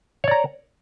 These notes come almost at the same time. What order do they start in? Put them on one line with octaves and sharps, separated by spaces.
C#5 D5 A#5